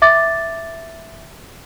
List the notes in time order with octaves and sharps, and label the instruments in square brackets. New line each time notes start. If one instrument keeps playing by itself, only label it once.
[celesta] E5 D6 A6